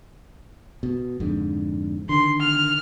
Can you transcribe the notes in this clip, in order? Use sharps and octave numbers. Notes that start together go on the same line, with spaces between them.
B2
F2 G#2 D3
D3 D#3 C6
F6